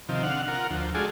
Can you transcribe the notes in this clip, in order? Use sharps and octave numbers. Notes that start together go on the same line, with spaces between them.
C3 D#3 F3
D3 F5 F#5
F4 A#4 F#5
D2 F3
G#3 F4 F#4 G#4 A4 D5